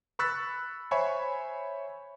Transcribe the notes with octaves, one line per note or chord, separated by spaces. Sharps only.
B5 C#6 E6 F#6 A6 B6
C5 C#5 E5 G#5 B5 C#6